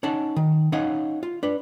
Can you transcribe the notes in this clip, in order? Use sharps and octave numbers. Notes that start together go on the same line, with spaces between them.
C#4 D#4 D5 F#5 A5
D#3
C#4 D#4 C#5 D#5 F5 F#5
F4
D4 B4